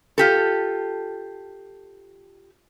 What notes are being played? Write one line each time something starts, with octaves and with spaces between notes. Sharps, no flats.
F4 G4 A4